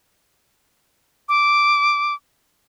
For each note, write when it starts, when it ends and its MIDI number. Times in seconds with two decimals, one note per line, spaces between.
1.29 2.14 86